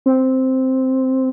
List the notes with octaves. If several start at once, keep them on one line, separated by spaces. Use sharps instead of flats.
C4